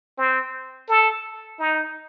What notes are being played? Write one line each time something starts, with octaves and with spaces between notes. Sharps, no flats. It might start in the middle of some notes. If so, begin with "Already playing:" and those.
C4
A4
D#4